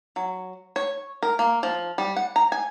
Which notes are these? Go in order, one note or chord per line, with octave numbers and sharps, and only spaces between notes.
F#3
C#5
A#4
A#3
F3
G3
F#5
A#5
G#5